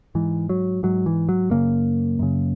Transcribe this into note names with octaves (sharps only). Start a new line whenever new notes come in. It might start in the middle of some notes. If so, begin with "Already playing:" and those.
G#2 E3
F#3
G#2 F#3
E3
F#3
F#2 C#3 A#3
F#2 C#3